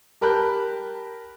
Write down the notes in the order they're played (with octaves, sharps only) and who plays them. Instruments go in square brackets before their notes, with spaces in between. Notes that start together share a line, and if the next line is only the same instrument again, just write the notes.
[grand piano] G4 A#4 A5 B5 F#6 G6